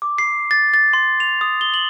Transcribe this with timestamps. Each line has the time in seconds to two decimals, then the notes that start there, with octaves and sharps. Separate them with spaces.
0.02 D6
0.18 C7
0.51 A6
0.74 A6
0.93 C6
1.20 F7
1.41 D#6
1.61 G7
1.74 F#7